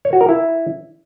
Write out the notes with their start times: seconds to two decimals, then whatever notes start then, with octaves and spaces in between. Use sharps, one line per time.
0.05 C#5
0.13 F#4
0.21 A#4
0.29 E4